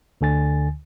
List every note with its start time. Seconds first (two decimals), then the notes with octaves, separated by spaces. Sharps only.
0.21 D2 D3 G#5 A6